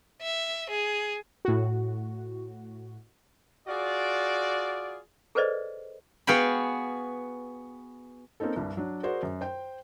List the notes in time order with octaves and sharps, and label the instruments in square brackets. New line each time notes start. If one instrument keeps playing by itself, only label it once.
[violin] E5
G#4
[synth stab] A2 F#4
[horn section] F4 F#4 G#4 D5
[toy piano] G#4 A4 B4 C5 D5 D#5
[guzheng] B3 F#4 G#4 F5 G5 B5
[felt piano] A#3 C4 C#4 D#4 A4
C2 G2
F#3 D4
F#4 G#4 A#4 C5 D5
F#2
C5 G5